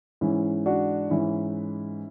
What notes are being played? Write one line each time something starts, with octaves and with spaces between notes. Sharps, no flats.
G#2 E3 C#4 E4
D4 F#4
G#2 E3 C#4 E4